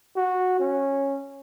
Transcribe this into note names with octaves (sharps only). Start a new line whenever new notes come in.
F#4
C#4